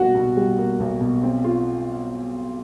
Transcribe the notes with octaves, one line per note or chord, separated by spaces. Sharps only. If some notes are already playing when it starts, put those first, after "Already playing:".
Already playing: B1 G3 A#3 F#4
B2
G3
A#3
B1
B2
C4
F4